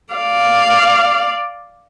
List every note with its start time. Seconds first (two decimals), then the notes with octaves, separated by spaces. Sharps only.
0.14 D5 F5